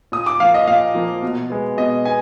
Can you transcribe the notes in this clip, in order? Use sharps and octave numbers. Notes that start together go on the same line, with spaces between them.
A#2 D#6
D6
F3 A#3 F5
D#5
A#2 F5
F3 A#3
B2
G#3 B3
B2 D#5
B3 G#5